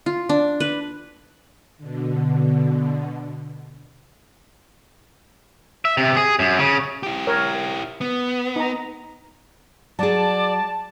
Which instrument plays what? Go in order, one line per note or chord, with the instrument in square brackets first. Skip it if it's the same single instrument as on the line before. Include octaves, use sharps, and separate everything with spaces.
[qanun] F4
D4
B4
[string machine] B2 D3
[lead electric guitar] E5
C3
G#4
F#2
C#3
E4 G4
[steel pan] A#4 C#5
[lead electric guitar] B3
[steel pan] D#4 A#5
[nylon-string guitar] F#3 G#4 [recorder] D5 [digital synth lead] A5